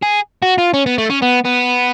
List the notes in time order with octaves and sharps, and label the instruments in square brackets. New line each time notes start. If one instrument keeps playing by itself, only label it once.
[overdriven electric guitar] G#4
F#4
F4
C#4
B3
A3
C#4
B3
B3